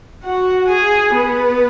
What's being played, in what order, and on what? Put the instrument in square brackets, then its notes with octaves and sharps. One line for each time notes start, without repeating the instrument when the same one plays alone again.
[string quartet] F#4 F#5
G#4 G#5
B3 B4